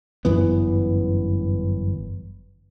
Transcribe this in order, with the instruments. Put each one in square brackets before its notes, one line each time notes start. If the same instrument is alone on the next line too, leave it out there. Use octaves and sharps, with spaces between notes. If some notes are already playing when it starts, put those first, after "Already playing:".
[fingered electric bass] G1 F#2 E3 B3